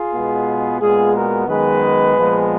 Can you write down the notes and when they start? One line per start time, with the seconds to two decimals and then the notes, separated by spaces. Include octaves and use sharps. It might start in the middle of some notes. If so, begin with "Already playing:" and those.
Already playing: F4 G#4
0.12 B2 G#3 B3
0.80 A#2 G#3 B3 F4 G#4
1.14 F#4 A#4
1.48 F#2 D#3 G#3 B3 G#4 B4
2.16 A#2 F3 G#3 B3